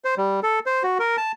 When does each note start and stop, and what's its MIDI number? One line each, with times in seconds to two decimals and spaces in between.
0.05 0.15 72
0.18 0.40 55
0.43 0.59 69
0.66 0.83 72
0.83 0.98 66
0.99 1.16 70
1.17 1.32 81